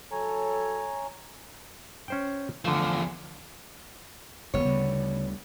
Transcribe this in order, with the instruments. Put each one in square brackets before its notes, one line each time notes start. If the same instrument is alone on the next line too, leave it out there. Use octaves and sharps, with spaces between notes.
[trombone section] F#3 A4 [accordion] C#5 G#5 A#5
[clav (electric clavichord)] C#4 C5 G5
[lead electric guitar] E2 F3 [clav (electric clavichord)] D3 A3
[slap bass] F#1 D#2 [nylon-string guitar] B3 C#5
[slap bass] D2 G3 [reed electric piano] C#3